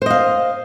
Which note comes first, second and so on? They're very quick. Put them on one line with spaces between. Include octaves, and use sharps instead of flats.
C5 D#5 F5